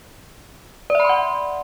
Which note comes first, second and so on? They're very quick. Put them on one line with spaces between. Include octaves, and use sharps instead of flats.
D5 E5 B5 C6 F#5